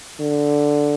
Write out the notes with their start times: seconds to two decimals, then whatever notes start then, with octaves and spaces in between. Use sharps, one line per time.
0.20 D3